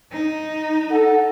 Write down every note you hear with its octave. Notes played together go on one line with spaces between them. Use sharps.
D#4
A4 F#5